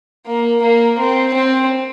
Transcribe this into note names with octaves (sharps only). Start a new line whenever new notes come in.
A#3
A#3
C4
C4